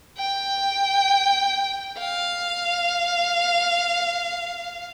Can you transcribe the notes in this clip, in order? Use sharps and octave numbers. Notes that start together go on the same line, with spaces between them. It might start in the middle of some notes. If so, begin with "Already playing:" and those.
G5
F5